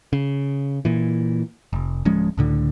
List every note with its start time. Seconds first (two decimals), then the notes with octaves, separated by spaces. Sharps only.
0.13 C#3
0.85 A#2 E3
1.73 F1
2.05 D1 F3 G#3 C#4
2.37 C#2 A2 D3